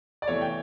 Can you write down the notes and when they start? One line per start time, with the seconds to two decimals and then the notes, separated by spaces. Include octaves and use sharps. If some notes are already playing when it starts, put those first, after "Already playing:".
0.22 D5
0.28 E2 C3 E3 A3 C#5
0.41 G5